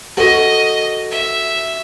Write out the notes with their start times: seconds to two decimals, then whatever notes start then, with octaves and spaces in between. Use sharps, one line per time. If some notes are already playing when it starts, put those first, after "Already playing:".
0.17 F#4 A4 D#5
1.11 E5